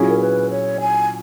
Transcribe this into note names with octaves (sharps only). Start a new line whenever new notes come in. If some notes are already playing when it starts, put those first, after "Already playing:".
Already playing: A#2 F#3 C#4 E4 G#4
A#4
B4
C#5
G#5